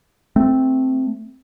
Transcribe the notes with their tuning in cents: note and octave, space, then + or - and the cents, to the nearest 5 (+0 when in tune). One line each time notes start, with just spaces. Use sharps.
A3 +5 C4 +0